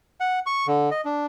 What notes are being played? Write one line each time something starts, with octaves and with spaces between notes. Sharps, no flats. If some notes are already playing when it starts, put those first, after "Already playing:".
F#5
C#6
D3
D#5
D4